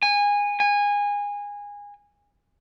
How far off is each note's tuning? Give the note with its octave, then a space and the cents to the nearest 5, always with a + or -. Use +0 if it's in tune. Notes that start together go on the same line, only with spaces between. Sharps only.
G#5 -20
G#5 -20